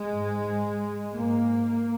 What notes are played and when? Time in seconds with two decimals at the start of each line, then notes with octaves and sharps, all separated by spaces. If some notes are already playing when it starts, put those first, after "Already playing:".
Already playing: G#3
0.13 G#2
1.14 G#2 A#3